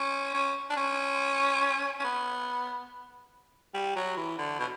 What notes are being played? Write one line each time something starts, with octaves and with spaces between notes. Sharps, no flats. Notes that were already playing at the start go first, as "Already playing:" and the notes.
Already playing: C#4
C#4
D4
C#4
C#4
B3
G3
F#3
E3
D3
B2